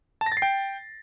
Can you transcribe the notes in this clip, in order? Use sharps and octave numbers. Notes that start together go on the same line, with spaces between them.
A5
A#6
A6
C7
G5